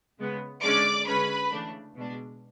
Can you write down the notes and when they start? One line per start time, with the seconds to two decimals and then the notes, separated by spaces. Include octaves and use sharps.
0.19 C#3 G#3 B3
0.62 D3 G#3 C#4 D5 D6
1.07 D3 G#3 C#4 B4 B5
1.52 C#3 E3 A3 D4
1.96 B2 G#3 D4